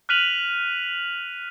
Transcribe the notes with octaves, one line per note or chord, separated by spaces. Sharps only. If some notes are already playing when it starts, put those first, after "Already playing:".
F6 F#6 B6 D#7 F7 F#7